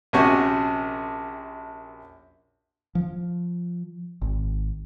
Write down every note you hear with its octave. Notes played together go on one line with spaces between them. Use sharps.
A#1 C3 C#4 F#4 C#6
F3
G#1